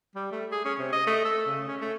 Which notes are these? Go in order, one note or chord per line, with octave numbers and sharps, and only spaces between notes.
G3
A3
G#4
C#4
C3
D#5
A3
A4
C#3
C#4
A3